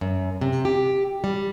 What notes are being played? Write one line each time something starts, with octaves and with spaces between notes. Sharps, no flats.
F#2
C3
G4
G3